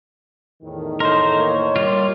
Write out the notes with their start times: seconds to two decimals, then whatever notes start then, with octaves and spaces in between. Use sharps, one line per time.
0.63 E2 A2 D#3
1.00 A3 D#4 A#4 C5 C#5 D#5 C6
1.37 A#3 C#5
1.76 G3 F4